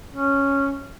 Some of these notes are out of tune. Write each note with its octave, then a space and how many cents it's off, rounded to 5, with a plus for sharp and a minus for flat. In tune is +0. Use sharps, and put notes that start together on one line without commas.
C#4 -5